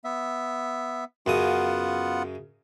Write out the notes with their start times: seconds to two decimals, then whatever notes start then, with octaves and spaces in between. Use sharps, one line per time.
0.04 B3 E5
1.26 F#2 C#3 B3 F4 F#5 D#6